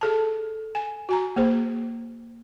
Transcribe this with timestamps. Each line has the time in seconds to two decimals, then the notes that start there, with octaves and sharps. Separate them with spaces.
0.01 G#4 A4 A5
0.75 G#5
1.09 F#4 G#5 A#5
1.36 A#3 G#4 C5